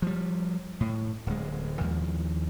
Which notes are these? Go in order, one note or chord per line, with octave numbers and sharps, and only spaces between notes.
F3 G3
A2
D1 G#3
D#2 F3